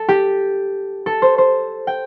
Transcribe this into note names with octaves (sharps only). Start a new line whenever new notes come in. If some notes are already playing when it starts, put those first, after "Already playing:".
Already playing: A4
G4
A4
C5
C5
G5